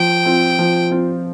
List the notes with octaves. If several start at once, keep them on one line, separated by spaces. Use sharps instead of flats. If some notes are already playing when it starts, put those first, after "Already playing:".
Already playing: F3 G5
C4 F4
F3
C4 F4